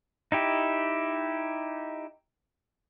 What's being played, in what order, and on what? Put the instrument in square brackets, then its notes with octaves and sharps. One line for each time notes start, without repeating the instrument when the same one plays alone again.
[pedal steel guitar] D#4 E4 G4